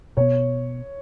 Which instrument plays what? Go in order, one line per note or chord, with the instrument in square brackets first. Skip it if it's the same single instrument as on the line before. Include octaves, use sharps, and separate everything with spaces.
[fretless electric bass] B2 B3 [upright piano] C#5